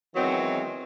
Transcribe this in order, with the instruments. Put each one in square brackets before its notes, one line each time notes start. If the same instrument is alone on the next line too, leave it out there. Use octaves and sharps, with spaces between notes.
[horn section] D#3 E3 F#3 G#3 B3 C4